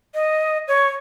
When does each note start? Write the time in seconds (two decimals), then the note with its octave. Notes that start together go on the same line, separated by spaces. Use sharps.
0.14 D#5
0.68 C#5